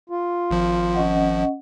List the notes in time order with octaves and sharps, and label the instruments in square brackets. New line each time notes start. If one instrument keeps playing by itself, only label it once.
[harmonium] F4
[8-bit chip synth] G#1 F3
[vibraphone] C#4 D#5 F#5